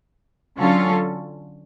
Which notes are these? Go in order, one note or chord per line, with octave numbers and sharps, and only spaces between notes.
D3 F#3 C#4 F4 A4